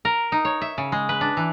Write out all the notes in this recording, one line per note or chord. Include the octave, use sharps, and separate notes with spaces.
A#4
D#4
C#5
E5
C#3
G#3
B4
D4
E3